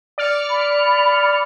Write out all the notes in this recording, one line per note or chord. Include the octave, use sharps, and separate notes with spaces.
D5 F6 C#7
B5